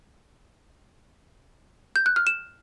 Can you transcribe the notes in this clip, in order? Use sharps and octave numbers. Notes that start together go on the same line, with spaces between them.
G6
F#6
F6
E7